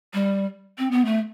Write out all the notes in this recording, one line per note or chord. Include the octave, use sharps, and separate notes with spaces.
G3
C4
B3
A3